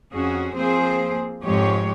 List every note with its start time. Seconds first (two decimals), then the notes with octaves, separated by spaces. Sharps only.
0.13 F2 C#4 F#4 G#4
0.56 F3 A#3 C4 G#4 C5
1.44 F2 G#2 F3 G#3 G4 C#5